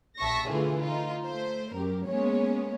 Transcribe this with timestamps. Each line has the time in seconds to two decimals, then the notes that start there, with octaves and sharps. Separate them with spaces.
0.18 A#1 E5 A5 C#6 A#6
0.48 D3 E3 A3 F4 G#4
0.80 D#4 F4
1.26 A3 C5
1.74 F#2 G4 A#4
2.05 G#3 A#3 B3 C#4 C#5